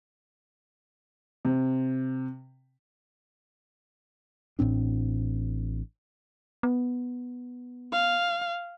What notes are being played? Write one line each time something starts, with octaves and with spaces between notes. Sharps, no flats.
C3
A1 A2 C4 D4
B3
F5